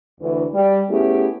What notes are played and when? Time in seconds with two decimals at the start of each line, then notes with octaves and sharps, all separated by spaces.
0.21 D2 E3
0.54 G3
0.90 A3 B3 C#4 E4 G4 G#4